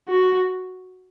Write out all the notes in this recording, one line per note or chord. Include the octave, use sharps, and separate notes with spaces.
F#4